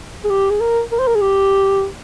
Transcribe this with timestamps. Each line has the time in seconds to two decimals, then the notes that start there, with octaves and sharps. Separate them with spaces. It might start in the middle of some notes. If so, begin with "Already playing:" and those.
0.24 G#4
0.30 G4
0.50 G#4
0.61 A#4
0.92 A#4
0.99 C5
1.07 A#4
1.15 G#4
1.21 G4